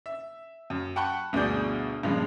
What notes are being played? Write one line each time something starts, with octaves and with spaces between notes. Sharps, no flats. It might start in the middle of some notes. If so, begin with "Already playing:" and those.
E5
F#2
F#5 G5 A5 B5 C#6 F#6
G1 D2 B2 G#4 D5 G6
G2 A#2 C#3 F3 G#3